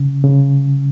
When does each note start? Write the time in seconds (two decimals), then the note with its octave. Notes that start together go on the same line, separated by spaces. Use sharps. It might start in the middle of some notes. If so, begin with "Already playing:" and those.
Already playing: C#3
0.24 C#3